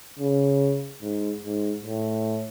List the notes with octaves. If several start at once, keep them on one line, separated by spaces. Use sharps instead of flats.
C#3
G#2
G#2
A2